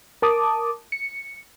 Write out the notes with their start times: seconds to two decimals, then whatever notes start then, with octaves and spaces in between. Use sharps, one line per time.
0.22 A#4 A5 D6 D#6
0.92 C#7